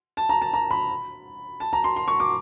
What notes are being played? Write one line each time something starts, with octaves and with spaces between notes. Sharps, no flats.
A5
A#5
A5
A#5
B5
A5
A#5
C6
C6
C#6
D6